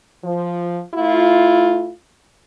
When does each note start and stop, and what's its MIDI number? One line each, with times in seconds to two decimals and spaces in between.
0.24 0.81 53
0.95 1.91 57
0.95 1.91 64
0.95 1.91 65